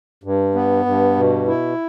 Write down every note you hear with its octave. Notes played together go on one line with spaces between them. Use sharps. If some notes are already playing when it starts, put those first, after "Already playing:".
G2
B3
G2
B2
E4